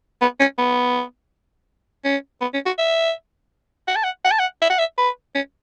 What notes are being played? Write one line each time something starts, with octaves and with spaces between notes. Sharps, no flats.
B3
C#4
B3
C#4
B3
C#4
F#4
E5
F#5
A5
F#5
F#5
A5
F#5
E5
F#5
E5
B4
C#4